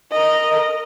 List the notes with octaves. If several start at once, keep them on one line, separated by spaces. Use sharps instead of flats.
A#4 D#5